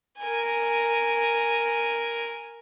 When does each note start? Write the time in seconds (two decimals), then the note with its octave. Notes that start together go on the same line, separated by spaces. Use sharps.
0.20 A#4 G#5